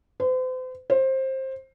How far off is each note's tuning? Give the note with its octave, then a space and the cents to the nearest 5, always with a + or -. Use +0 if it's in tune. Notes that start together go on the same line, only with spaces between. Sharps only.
C5 -40
C5 +20